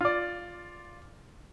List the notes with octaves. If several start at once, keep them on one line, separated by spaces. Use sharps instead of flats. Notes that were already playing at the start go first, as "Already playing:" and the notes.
F4 D5